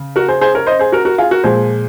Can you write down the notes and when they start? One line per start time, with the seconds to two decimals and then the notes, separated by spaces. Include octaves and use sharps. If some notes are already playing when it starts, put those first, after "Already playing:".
Already playing: C#3
0.16 F#4 A#4
0.28 G#4 C5
0.41 G#4 C5
0.55 A#4 C#5
0.67 C5 D#5
0.79 G#4 C5
0.92 F#4 A#4
1.05 F#4 A#4
1.18 F4 G#4
1.31 F#4 A#4
1.43 A#2 F3 G#3 G#4 C5